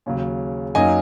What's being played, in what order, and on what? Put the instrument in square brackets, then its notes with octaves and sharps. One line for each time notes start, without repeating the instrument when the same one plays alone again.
[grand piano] D#2 C#3 F#3
F#2 F#3 A#3 D#4 D#5 G#5